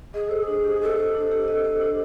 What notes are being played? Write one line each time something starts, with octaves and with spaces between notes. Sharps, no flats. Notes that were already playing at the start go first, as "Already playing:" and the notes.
G#4 D#5
A4 C5
D4 G#4
G4
A4 D#5
C5
D4
G4
D#5
C5
D4